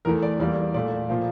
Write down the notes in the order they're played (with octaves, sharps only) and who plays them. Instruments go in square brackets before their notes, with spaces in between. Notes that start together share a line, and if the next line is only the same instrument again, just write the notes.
[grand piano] E2 E3 A3 A#4
D5
E2 E3 G3 A#3 D5
A#2 A3 D5
A#2 F3 A#3